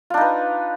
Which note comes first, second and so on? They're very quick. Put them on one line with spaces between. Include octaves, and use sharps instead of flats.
F4 D4 D#4 B4